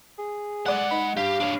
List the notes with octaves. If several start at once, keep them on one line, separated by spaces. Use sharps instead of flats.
G#4
G#3 D5 F#5 F#6
D#4 B5
G2 G4 F5
D4 C#5